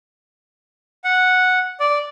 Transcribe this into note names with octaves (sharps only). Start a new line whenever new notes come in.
F#5
D5